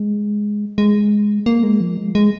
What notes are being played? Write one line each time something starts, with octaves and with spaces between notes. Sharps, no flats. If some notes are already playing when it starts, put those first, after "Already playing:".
Already playing: G#3
G#3
A#3
G#3
F3
G#3
G#3